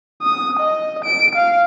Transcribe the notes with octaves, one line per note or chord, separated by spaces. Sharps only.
D#6
D#5
D7
F5